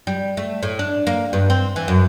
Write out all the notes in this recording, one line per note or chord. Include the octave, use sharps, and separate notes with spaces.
G3
A3
A2
D4
A#3
G2
C4
E3
F#2